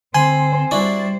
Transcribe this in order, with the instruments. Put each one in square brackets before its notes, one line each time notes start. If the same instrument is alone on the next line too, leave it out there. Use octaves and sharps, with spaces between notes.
[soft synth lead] D3 [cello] C4 C5 [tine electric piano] G#5 [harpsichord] B5 C6
[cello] G3 C5 [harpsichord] D4 E4 F#4 [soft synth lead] A6